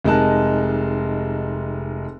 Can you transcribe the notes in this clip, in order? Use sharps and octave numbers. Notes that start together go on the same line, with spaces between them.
F1 G#3 D#4 A#4 A5 F#6